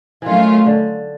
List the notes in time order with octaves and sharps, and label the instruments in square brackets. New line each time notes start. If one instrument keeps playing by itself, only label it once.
[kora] D#3 E3 [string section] F#3 A3 C#4 F4
[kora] D3